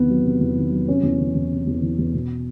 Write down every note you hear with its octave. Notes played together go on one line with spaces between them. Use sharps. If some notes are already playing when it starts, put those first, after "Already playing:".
Already playing: E2 C3 D#3 B3
F#3
C3
E2
D#3
F#3
C3 C#4
E2
E3
E2
C3
E2
E3
E2
B2